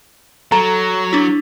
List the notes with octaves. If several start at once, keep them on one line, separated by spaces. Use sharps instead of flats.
F#3 A4 A#5
D4 E4